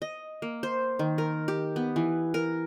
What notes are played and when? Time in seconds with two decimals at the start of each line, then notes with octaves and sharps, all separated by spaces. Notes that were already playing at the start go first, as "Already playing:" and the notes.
0.02 D#5
0.42 A#3
0.63 C5
0.99 D#3
1.18 A#4
1.48 G4
1.76 B3
1.96 E3
2.34 A#4